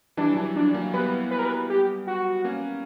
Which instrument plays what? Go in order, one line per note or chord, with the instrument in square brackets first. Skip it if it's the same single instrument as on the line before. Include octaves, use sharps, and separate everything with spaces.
[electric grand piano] E3 G3 [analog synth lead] D4
[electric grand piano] F#3
E3 G3
[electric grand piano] F#3 [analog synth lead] D4
[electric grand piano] F#3 A#3
[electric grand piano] G3 B3 [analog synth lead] B4
[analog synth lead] B4
A#4
B4
G4
F#4
[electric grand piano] A#3 C#4